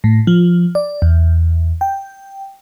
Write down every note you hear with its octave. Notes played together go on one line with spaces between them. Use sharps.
A2
F3
D5
E2
G5